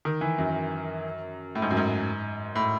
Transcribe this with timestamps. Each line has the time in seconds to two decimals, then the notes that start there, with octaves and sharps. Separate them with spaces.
0.05 D#3
0.21 E3
0.38 F#2
1.55 A2
1.62 G#2
1.71 F#2
1.77 G#2
2.56 A2